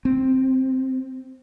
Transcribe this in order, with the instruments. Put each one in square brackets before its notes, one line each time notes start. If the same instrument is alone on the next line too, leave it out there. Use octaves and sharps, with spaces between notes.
[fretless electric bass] C4